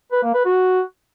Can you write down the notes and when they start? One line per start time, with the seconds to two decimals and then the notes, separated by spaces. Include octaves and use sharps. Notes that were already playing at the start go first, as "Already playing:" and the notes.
0.12 B4
0.23 A#3
0.34 B4
0.45 F#4